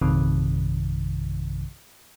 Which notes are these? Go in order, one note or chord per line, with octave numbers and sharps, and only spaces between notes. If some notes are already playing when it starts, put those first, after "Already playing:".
A#1 F#2 C3 D#3